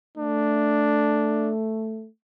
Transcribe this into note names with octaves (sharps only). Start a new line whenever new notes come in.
A3 D4